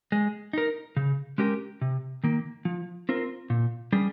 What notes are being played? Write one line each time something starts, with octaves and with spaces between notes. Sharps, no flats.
G#3
D#4 A#4
C#3
G#3 C#4 G4 A#4
C3
D#3 A#3
F3
C4 F4 A#4
A#2
G3 C#4 G#4